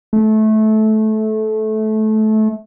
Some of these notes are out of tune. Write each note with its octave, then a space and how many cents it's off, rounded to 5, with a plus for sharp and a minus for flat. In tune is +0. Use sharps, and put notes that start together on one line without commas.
A3 -20